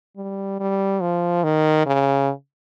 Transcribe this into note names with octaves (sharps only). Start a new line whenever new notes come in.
G3
G3
F3
D#3
C#3